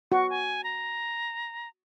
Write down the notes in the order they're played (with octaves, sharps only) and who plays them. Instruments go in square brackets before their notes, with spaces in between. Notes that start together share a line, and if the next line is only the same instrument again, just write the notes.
[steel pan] F#4 [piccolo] C#6
[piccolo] G#5
A#5